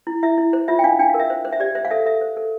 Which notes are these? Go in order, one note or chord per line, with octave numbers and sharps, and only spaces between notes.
E4
E4 E5
E4
C5
F4 E5
G5
D4 F5
D4 G5
F5
A#4
E5
C5
C5
E5
G4 D5
C5 E5
F5
A4 E5
A4 E5
C5
A4